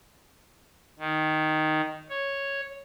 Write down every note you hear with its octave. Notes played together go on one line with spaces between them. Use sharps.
D#3
C#5